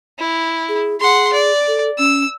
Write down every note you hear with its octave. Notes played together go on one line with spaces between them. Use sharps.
E4
G#4
G#4 F#5 C6
D5
A4
C#4 E6